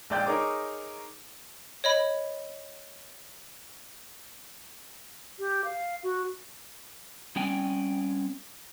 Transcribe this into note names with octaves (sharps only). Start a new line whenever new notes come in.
A#1 G#3 D5 G5 G6
D#4 G#4 A#4 C#5 D6
C#5 D#5 B5
G4
F5
F#4
G3 C4 C#4 G5 G#5